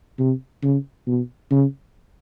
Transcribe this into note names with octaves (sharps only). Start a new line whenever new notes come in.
C3
C#3
B2
C#3